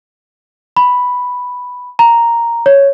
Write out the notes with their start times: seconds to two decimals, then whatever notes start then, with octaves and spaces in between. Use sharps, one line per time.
0.77 B5
1.99 A#5
2.66 C#5